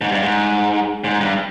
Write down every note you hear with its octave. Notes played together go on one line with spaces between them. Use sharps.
G#2
G2
G#2
G#2
G2